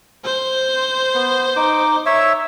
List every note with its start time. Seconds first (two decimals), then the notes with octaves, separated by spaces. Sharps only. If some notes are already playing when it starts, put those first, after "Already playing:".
0.25 C5
1.15 B3
1.56 D#4 D6
2.06 C#5 E5 E6